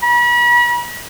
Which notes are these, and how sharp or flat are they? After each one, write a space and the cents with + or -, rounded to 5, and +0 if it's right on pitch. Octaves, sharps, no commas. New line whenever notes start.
B5 -40